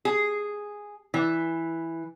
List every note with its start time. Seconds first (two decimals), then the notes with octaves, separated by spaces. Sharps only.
0.05 G#4
1.14 E3